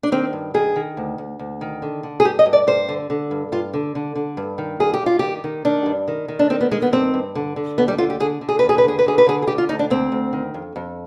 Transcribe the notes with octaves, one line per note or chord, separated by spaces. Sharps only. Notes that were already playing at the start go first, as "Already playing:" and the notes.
D4
D#3 C4
G2
D#3 G#4
D#3
D2
D2
D2
D#3
D3
D3
G#4
G2 G4
D#5
G2
D5
G2 C5
D3
D3
G2
G2 F4
D3
D3
D3
G2
D#3
G2 G#4
G4
G2 F4
D#3 G4
D#3
D#3 D4
G2
D#3
D#3
D4
D#3 C4
B3
D#3 G#3
B3
G2 C4
G2
D3
D3
D#2 B3
G3
D3 F4
G4
D3 G#4
D3
G#4
D#2 B4
G#4
B4
D3 G#4
B4
D3 G#4
B4
D3 G#4
G#4
D3 G4
F4
D2 D#4
D4
D2 C4
D2
D#3
F2
F2